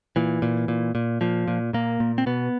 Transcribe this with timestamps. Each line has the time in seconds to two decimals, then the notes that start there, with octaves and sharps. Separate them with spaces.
0.16 A#2 E3
0.42 A#2
0.68 A#2
0.95 A#2
1.21 A#2 F3
1.48 A#2
1.73 A#2 A#3
2.00 A#2
2.18 C4
2.26 B2 B3